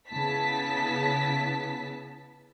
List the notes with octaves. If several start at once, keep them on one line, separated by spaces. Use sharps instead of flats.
C#3 B3 E4 A5 B6